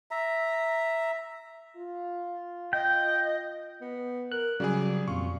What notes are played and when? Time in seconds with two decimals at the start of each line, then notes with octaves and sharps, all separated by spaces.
0.11 E5 A#5
1.76 F4
2.73 D#5 G5
3.81 B3
4.32 A#4 F#6
4.60 C#3 F#3 G3 G#4 D5
5.08 F2 A#2 F4 C#6